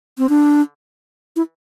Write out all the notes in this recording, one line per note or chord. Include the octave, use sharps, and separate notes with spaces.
C4
D4
E4